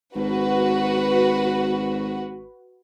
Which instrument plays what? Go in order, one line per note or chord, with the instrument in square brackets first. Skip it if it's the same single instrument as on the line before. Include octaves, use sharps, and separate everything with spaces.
[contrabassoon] G#1 [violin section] F#4 B4